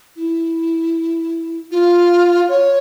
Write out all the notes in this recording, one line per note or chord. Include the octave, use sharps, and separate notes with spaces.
E4
F4
C#5